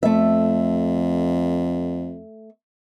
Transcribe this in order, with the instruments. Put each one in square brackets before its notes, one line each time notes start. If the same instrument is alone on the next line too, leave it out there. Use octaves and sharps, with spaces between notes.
[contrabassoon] F2 [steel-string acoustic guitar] A3 E5